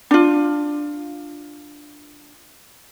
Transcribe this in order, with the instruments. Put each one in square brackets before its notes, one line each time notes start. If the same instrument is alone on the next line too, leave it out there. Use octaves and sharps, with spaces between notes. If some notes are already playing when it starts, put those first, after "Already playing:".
[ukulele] D4 F4